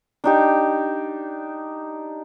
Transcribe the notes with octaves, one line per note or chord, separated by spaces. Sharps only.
D4 D#4 G4